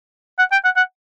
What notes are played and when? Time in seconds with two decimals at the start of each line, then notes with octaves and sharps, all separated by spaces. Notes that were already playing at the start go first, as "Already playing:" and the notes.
0.39 F#5
0.52 G5
0.65 F#5
0.76 F#5